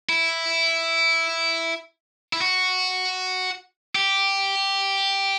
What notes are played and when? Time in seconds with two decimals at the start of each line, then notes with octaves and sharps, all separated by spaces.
0.09 E4
2.33 E4
2.41 F#4
3.95 G4